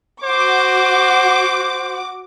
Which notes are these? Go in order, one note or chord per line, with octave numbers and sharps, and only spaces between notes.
F#4 C5 D6